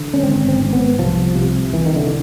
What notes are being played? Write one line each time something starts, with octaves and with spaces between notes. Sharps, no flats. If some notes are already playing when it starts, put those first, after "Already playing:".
Already playing: D3
C#4
G#1 C4
C4
G#1
B3
C2 F3
C3
C2 E3
D#3
D3